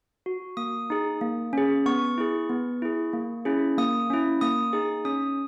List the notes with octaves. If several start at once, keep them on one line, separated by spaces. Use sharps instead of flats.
F#4
A#3 D#6
D#4 G#4
A#3
C#4 G#4
B3 C#6
E4 G#4
B3
E4 G#4
A#3
C#4 E4 G#4
A#3 D#6
C#4 E4
A#3 D#6
D#4 G#4
C#4 D#6